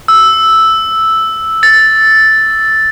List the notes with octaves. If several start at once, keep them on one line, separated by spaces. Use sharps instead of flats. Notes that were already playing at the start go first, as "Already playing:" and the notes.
E6
A6